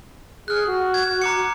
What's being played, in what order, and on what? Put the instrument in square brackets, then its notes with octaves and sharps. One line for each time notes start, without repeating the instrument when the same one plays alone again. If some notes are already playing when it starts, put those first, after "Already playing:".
[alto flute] G#4 [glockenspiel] F6 F#6
[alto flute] F#4
[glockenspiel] G#6
A#5 D6 C#7